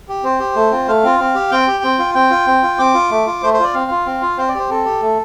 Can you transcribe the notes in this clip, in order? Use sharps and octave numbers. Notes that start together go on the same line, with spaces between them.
G4
C4 C5
G4
A3
C4 F4
A3 F5
C4 F4
C4
G4
C4 G5
G4
C4
F4
C4 G5
F4
C4
F4
C4 D6
F4
A3
F4
A3 C5
C5
F4 D5
C4 F5
F4
C4
F4
C4 C5
D5
G4 C5
C4 A4
G4
A3